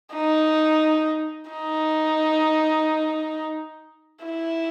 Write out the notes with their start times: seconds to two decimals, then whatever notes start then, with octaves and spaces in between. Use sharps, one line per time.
0.14 D#4
1.51 D#4
4.25 E4